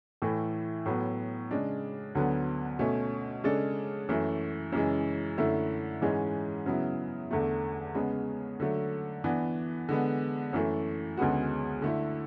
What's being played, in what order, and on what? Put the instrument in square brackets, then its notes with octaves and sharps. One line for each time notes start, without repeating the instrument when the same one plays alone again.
[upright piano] A2 E3 A3 E4
A2 F#3 B3
C#3 G#3 D4
D2 D3 F#3 B3
B2 A3 C#4
C#3 G#3 D4 A4
F#2 E3 A3
F#2 C#3 E3 G#3
F#2 D3 A3 E4
G#2 E3 G#3 C#4
C#3 F#3 B3 E4
E2 D3 A3
C#3 G#3 B3
D3 F#3 A3
E3 B3 D4
D3 G#3 B3
F#2 E3 A3
D2 C#3 G#3 B3 F#4
D3 A3 E4